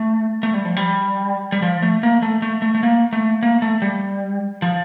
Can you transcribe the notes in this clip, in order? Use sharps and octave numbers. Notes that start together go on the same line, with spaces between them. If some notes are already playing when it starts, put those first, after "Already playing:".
Already playing: A3
A3
G3
F3
G3
G3
F3
A3
A#3
A3
A3
A3
A3
A#3
A3
A#3
A3
G3
F3